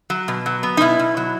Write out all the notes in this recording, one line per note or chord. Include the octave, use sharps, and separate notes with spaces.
F#3
B2
F#3
B3
D#4
B2 E4
B2
F#3